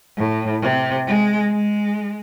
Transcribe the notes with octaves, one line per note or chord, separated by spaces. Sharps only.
A2
C3
G#3
G#3